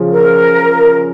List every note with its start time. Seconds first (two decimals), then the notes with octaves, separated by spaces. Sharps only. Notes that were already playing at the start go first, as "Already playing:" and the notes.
Already playing: C#3 F3
0.12 A#4